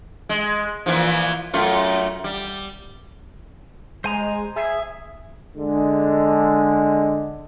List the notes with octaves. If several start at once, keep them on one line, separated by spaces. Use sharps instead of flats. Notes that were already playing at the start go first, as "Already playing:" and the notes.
G#3
A#2 E3 F3
F#2 A3 F4
G3
G#3 C5 G#5 A#5
G#4 E5
D3 G#3